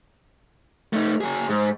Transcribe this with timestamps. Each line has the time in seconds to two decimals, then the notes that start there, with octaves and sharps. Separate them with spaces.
0.93 A3 D#4
1.21 F#3 G#4
1.49 G#2